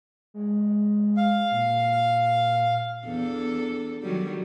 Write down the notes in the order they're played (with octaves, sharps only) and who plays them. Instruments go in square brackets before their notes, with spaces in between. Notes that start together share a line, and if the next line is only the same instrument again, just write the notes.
[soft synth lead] G#3
[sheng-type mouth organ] F5
[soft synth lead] A#2
[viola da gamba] E2 D4 A4
D#3 F#3 G3